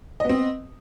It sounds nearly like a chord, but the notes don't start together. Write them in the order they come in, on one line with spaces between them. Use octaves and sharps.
D#5 B3 C4